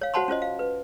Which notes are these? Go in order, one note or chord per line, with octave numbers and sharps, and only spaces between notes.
C#5 F5
F#4 C5 F#5 A5 B5 C6
C#4 F4 C5 D#5
F5
B4